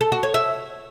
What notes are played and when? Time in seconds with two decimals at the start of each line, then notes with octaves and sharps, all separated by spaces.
0.01 A4
0.12 F#4
0.23 C#5
0.34 E5